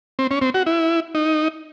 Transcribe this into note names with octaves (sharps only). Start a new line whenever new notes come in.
C4
C#4
C4
F#4
E4
D#4